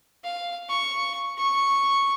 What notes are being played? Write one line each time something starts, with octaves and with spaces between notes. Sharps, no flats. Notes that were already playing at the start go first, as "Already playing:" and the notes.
F5
C#6
C#6